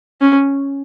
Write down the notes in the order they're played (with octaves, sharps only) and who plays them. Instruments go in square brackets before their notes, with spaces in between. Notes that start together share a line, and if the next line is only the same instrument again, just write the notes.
[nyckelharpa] C#4